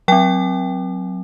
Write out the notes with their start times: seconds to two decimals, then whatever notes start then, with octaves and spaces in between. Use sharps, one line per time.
0.08 F#3 C4 G5